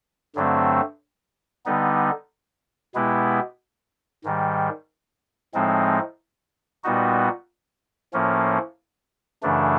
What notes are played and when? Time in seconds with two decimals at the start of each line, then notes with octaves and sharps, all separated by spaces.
0.36 G2 D3 F#3 A3 C4
1.66 D3 G3 B3 D#4
2.95 B2 G#3 B3 E4 G4
4.24 G#2 D#3 G3
5.54 A2 F3 G#3 C4 D#4
6.84 A#2 G3 B3 D#4 F#4
8.13 A2 F3 A#3 C#4
9.43 F#2 C#3 E3 A3 D4